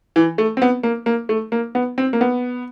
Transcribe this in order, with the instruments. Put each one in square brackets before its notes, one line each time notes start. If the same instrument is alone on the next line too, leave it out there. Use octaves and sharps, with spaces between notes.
[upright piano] E3
A3
C4
B3
A#3
A#3
A3
A#3
B3
C4
A#3
B3